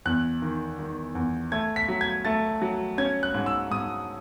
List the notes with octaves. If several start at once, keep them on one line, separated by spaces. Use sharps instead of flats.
E2 F#6
D#3
D#3
E2
A3 G#6
B6
F#3
G#6
A3 A6
F#3
C#4 G#6
F#6
G#2
E6
G#2 D#6